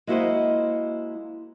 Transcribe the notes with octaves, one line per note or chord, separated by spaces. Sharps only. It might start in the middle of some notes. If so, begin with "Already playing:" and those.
G#3 A#3 E4 F#4 C5 D#5